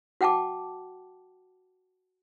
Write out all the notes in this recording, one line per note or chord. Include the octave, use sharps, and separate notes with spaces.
F#4 F#5 G5 A5 D6